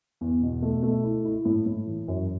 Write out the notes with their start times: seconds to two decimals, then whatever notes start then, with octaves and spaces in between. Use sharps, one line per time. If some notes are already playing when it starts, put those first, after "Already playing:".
0.21 E2
0.42 B2
0.62 A3
0.83 A3
1.04 E4
1.25 E4
1.45 A2
1.66 A2
1.87 E3
2.08 F#2